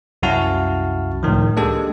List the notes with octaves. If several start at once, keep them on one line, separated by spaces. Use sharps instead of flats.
C2 F#2 E4 F#4 F5 A5
C#2 A2 D#3 F3
G#3 A#3 D4 G4 A4